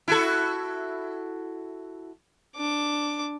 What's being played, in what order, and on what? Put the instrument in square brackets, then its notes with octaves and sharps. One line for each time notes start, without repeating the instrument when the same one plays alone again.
[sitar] E4 F#4 A4
[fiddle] D4 D6